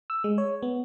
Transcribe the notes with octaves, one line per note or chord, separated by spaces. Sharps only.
E6
G#3
C#5
B3